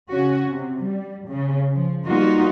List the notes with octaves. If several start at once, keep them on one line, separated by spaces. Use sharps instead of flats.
C#3 C#4 F#4
C3
G3
C#3
F3
G3 A#3 B3 D#4 F4 F#4